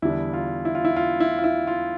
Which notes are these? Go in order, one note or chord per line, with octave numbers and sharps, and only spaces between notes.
E2 D3 G3 D4 E4
F4
E4
F4
E4
F4
E4
F4
E4
F4